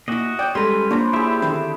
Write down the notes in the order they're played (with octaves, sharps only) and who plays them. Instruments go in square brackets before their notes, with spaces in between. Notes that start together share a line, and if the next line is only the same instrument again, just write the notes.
[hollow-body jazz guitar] A#2 E4 [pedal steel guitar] F#4 D#5
[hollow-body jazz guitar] C#5 D5 [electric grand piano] G5 G6
[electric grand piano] G3 G#3 A4 [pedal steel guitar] C#4 B4 [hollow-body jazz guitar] A#5 C6
[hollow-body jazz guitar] A#3 F4 A#5 [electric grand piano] D4 [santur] C5 C#5 B5
[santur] E4 G#4 [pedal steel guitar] G4 E5
[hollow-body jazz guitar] D3 D#3 C4